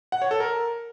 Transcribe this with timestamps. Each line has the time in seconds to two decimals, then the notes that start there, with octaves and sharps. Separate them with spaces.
0.12 F#5
0.22 C#5
0.31 A4
0.40 A#4